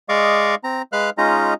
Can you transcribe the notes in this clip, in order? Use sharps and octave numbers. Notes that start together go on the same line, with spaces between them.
G#3 D5 D#5 F5 C#6 D6
C4 A#5
G#3 B4 F5 F6 F#6
G#3 C#4 D#4 F4 D#5 A#5